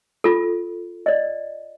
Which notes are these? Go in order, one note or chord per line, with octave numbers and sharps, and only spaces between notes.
F4 A4
D5 D#5